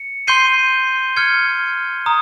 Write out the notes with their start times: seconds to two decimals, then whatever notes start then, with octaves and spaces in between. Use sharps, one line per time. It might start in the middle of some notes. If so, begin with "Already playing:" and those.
Already playing: C#7
0.27 C6 G6 C7 D#7 G7
1.17 F6 G#6 C#7 G7
2.06 A#5 D#6